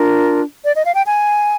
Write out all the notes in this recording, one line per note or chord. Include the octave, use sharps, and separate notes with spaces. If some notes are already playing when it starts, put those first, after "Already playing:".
Already playing: D4 F4 A#4
D5
D#5
F5
G5
G#5